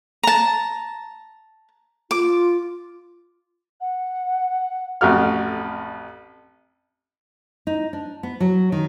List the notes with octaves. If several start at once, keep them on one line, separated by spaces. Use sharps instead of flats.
A5 A#5
F4 D6
F#5
A1 F2 F#4 F6
D#4
D4
B3
F#3
D#3